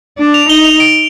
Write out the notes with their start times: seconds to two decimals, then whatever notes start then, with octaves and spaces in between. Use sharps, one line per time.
0.18 D4
0.34 F7
0.49 D#4 G7
0.64 F7
0.80 D7